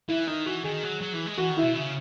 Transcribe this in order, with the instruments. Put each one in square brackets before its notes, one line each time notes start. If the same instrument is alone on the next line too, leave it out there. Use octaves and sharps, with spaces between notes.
[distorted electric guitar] E3 [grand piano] E4
[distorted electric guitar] D#3 [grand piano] D#4
[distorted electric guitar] E3 [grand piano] F#4
[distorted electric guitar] D#3 [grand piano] G#4
[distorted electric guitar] F#3
F#3
E3
G#3
[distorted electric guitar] E3 [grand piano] F#4
[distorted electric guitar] D#3
[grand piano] E4
[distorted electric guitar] B2
C#3